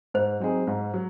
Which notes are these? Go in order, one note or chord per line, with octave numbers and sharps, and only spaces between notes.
G#2 C5
F#3 C4 D#4 G#4
G#2
F#3